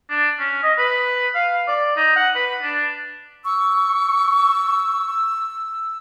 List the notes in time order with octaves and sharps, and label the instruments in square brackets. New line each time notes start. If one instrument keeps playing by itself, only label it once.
[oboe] D4
C#4
D#5
B4
F5
D5
D#4
F#5
B4
D4
[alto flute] C#6 [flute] E6